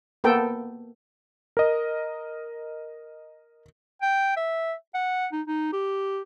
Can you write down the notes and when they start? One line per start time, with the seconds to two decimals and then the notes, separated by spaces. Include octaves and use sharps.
0.24 A#3 B3 A4 G5
1.57 A#4 D#5
4.02 G5
4.36 E5
4.94 F#5
5.32 D#4
5.47 D#4
5.72 G4